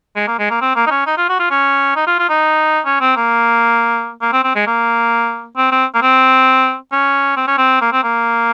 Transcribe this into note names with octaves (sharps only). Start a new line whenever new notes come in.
G#3
A#3
G#3
A#3
C4
A#3
D#4
C#4
D#4
F4
F#4
F4
C#4
D#4
F4
F4
D#4
C#4
C4
A#3
A#3
C4
C4
G#3
A#3
C4
C4
A#3
C4
C#4
C4
C#4
C4
A#3
C4
A#3